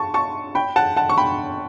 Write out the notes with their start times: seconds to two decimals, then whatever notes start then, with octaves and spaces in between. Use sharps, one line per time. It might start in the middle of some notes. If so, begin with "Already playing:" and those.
Already playing: A5 C#6
0.14 A5 C#6
0.55 G5 B5
0.76 F#5 A5
0.97 F#5 A5
1.09 C#6
1.18 G5 B5